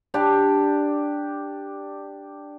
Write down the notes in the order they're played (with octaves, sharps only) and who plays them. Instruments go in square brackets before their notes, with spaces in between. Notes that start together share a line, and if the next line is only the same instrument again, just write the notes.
[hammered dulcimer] D4 G4 D5